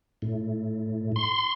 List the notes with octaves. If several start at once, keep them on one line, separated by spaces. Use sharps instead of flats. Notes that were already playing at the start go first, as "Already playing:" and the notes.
A2
C6